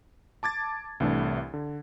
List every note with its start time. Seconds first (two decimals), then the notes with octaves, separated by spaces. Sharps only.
0.43 A5 D6 G#6 A6
1.00 C2 A2 E3 A3 D4
1.54 D3